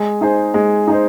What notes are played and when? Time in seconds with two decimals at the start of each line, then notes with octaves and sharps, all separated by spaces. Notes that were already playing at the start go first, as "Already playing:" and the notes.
Already playing: G#3
0.21 D#4 G#4 C5
0.54 G#3
0.88 D#4 G#4 C5